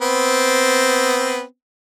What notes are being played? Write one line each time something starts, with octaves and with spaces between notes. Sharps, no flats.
B3 C4